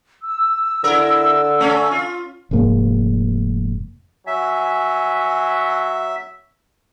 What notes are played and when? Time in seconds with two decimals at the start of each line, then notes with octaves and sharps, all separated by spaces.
0.23 E6
0.84 D3 E4 A#4
1.60 A3 C#4
1.91 F4
2.51 F1 G#2 G#3 A#3
4.27 F#3 E5 G#5